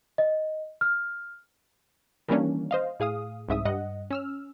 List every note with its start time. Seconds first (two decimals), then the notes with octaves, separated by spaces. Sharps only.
0.18 D#5
0.81 F6
2.28 D#3 E3 G3 A#3 C#4 D4
2.71 C5 D#5 F5
3.00 A2 G#4 F5 D#6
3.48 C2 G#2 E5 D#6
3.65 G2 D#5 F#5
4.11 C#4 E6 F6